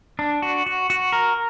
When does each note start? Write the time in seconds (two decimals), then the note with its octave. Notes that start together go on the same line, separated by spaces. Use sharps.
0.19 D4
0.42 F#4
0.66 F#4
0.90 F#4
1.12 A#4